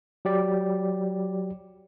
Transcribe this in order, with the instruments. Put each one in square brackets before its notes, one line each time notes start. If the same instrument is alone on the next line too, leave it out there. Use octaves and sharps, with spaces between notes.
[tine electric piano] F#3 G4 D5